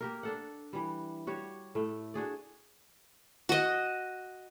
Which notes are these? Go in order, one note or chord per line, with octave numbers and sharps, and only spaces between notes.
A#3 G4 A#4
D4 A4 F#5
E3 G3
G3 F#4 G4 C#5
A2 A3
D4 F#4 G#4 D5
F#4 D#5